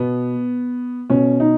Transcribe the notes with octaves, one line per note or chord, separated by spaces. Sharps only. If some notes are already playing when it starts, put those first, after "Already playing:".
Already playing: B2 B3
B2 C#4
D#4